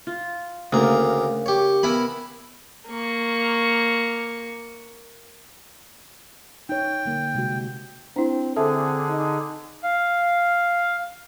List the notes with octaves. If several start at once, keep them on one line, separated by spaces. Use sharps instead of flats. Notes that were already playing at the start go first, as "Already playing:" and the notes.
F4
D2 C#3 A#3 A#5
G4 C#5
B3 E4 A#4 G#5 B5
A#3 C#6
D#4 C#5 G5
D3 A#3
C3 G#3 F#4
C4 D4 E4
D3 C4 G#4 A4 E5 A5
D#4
F5